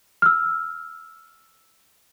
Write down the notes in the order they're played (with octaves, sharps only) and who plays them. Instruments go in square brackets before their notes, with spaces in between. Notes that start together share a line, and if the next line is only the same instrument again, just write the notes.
[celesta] E6 F6